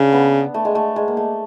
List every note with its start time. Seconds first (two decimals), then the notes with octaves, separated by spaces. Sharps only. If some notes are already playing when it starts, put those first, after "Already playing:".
Already playing: C#3 D4
0.12 B3
0.54 A3
0.65 G#3
0.75 A3
0.96 G#3
1.08 A#3
1.17 A3